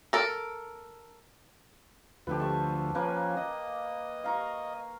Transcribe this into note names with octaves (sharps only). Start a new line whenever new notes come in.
A4 A#4
D2 F3 G4 A4 B4
A5 C#6
F3 A#3 C#4 B4
D#5
F5 A#5 C#6